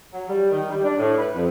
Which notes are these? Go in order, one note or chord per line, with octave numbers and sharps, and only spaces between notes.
F#3
G3
D#3
G3
D4
A2
B4
F2